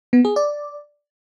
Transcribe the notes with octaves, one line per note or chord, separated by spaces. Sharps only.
B3
G#4
D5